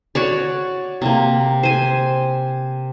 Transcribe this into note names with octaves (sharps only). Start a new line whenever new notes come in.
F#4 C#5 D5
C3 A#3
C5 G#5